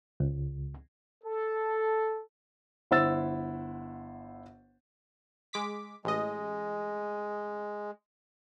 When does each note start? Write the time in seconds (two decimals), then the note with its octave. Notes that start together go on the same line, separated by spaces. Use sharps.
0.20 C#2
1.24 A4
2.91 G1 E4 C5 F#5 E6 A6
5.53 G#3 D6 B6
6.05 A1 G#3 D#5